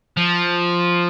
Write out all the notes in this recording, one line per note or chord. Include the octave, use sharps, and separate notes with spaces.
F3